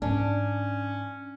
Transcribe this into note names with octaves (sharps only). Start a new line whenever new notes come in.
G#2 E3 C#4 D4